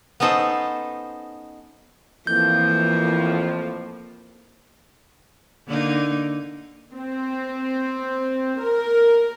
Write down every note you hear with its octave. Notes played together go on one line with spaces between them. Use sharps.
B3 C#4 D#4 A4 C5
F2 A2 E3 F3 A#3 G6
D3 A#3 D#4
C4
A#4